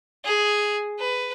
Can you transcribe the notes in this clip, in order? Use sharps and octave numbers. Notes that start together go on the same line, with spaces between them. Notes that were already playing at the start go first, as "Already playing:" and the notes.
G#4
B4